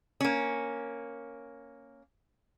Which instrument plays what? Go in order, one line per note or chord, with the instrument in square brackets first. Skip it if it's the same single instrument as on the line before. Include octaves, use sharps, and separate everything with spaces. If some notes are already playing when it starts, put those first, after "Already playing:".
[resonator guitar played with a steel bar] A#3 C#4